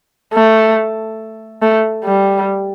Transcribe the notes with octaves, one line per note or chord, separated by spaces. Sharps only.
A3
A3
G3